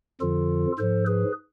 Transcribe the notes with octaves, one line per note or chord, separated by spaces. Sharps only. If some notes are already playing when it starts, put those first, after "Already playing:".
F2 D3 F3 F4 A4
G#2 F3 A4 C5
G#4 B4